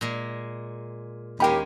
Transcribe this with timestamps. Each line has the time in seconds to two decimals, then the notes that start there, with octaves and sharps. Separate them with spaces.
0.01 A#2 G#3
1.40 D#2 G#3 A#3 C#4 G4 G5 B5